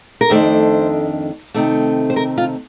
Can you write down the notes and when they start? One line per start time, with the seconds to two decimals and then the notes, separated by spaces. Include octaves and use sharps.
0.21 A#4
0.30 F2 D#3 A3 D4 C5
1.54 C3 D#3 A3 C4
2.10 C5
2.16 A#4
2.38 F4